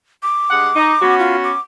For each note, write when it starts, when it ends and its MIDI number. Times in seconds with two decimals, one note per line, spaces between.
0.23 1.15 86
0.50 0.69 43
0.50 0.69 56
0.50 0.69 78
0.75 0.94 63
1.02 1.51 59
1.02 1.51 61
1.02 1.51 66
1.19 1.36 65
1.44 1.59 86